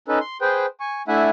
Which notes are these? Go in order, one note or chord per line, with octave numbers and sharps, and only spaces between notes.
C#4 D#4 A4 B4
C6
G#4 B4 C5 G5
G#5 C#6
A3 D4 E4 E5 F#5 G#5